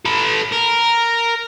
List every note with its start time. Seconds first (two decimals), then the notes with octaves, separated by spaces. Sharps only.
0.06 A4 B4
0.52 A#4